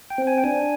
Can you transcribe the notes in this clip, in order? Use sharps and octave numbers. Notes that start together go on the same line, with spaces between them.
G5
C4
G#5
G5
D4 G#5